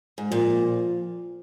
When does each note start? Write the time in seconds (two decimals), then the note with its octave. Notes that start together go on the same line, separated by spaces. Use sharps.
0.18 G#2
0.31 A#2 F3